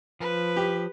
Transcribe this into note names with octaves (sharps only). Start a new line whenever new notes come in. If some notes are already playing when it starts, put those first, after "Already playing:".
F3 B4
G4